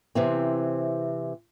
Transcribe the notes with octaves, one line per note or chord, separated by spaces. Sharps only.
C3 E3 C4